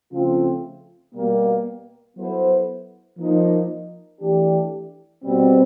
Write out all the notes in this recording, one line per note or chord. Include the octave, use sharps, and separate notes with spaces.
C#3 F3 A3 C4 F4
B2 G3 A#3
F#3 B3 E4 A4 C5
F3 A#3 D#4
E3 A3 D4 G4
B2 G3 C4